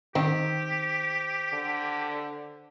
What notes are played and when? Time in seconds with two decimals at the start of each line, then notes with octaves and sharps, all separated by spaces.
0.15 D#3 C4 G4
1.53 D3